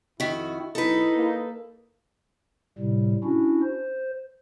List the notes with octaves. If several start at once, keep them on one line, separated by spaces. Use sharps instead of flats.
F2 D#3 E4 F#4
B1 D#4 E4 A4 B4
A#3
A2 C3 G3
C#4 D4 E4 F#4
C5